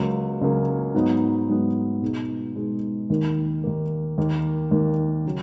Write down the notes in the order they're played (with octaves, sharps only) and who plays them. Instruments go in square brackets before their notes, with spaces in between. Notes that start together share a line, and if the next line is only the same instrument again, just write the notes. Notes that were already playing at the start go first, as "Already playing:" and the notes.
Already playing: [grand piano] C#2 C#3 F#3 A#3
C#2 C#3 F#3 A#3
G#2 F#3 B3 D#4
G#2 F#3 B3 D#4
B2 G#3 D#4
B2 G#3 D#4
D#2 D#3 A#3
D#2 D#3 A#3
D#2 D#3 A#3
D#2 D#3 A#3
C#3 F#3